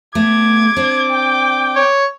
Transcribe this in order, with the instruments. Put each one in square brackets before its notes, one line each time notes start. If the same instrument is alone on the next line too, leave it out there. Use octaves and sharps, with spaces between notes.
[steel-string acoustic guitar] A3 B3 [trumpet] D6 [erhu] G#6
[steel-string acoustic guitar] C4 D4
[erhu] G5
[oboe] C#5